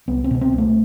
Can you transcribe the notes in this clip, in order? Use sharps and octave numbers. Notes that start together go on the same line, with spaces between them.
C2 B3
C4
B2 B3
C4
C2
A3